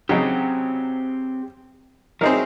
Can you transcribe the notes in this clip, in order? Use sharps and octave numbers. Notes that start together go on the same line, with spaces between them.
C#3 F#3 C4 D#4 G4
F#3 C4 D#4 E4 G#4 A#4